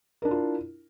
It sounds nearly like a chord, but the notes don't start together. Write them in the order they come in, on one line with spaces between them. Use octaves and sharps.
A#4 D4 E4 F4